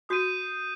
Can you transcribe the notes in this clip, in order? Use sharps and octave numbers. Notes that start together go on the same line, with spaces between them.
F#4 D#6 G6 C7 D#7